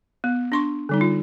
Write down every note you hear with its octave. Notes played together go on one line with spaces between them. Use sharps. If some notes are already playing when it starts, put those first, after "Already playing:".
B3
D4 C6 C#6
D3 G3 D#4
F4